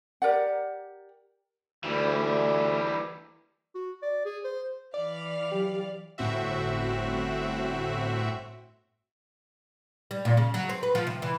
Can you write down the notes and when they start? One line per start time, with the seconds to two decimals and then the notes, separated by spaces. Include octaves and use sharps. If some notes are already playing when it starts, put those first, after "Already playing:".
0.22 G4 A#4 D5 F#5
1.84 D2 E3 G3
3.75 F#4
4.03 D5
4.25 G#4
4.44 C5
4.94 E3 D5 F5
5.52 F#3 G4
6.18 G1 A2 C4 F#4 E5
10.11 G3
10.25 A#2
10.37 C#3
10.54 F#3
10.69 C4
10.83 B4
10.95 F3
11.07 C3
11.22 E3